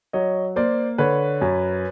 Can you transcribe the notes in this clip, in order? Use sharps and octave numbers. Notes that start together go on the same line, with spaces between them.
F#3 C#5 D#5
A#3 C5 D5
D3 B4 C#5
F#2